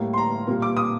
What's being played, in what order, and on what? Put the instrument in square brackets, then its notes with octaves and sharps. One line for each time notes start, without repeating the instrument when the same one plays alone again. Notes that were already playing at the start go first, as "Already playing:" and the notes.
Already playing: [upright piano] A2 G3 A#3
C6
A#5
A#2 G3 A#3
D6
D#6